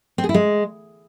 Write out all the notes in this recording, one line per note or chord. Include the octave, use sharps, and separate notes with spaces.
C4
G#4
E4
G#3